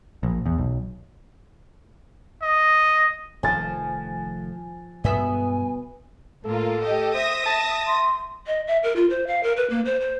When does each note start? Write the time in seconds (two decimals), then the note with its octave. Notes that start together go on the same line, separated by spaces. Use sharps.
0.23 A#1
0.46 E2
0.58 B1
2.42 D#5
3.43 F1 D#3 F3 A3 G#5 A6
5.04 G2 B2 G#3 B3 E5 G#5
6.44 A2 A#3 F4 A4
6.83 G4 D#5
7.14 C5 E5 D#6 A#6
7.46 A5
7.87 C6
8.47 D#5
8.67 E5
8.83 A#4
8.96 F4
9.10 C5
9.27 F5
9.43 A#4
9.57 B4
9.70 A#3
9.85 C5
10.00 C5